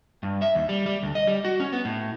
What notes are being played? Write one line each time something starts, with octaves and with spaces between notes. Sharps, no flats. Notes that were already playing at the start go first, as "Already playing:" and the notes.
G2
E5
D#2
G3
G3
D2
D#5
G3
F#4
C#4
B3
A2